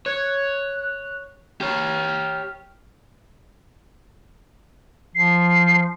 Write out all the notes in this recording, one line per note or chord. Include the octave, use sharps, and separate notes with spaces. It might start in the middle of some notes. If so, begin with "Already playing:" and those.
C#5 F#6
G4 C#5 F6
F3 C7